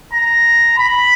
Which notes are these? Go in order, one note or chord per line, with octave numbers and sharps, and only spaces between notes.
A#5
B5